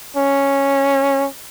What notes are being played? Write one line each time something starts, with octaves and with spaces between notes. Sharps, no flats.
C#4